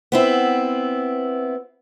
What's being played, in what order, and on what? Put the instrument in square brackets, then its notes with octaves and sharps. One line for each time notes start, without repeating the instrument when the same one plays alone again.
[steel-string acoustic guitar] B3 C4 E4